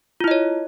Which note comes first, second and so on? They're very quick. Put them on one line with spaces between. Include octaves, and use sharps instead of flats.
F4 E4 D#5 C#5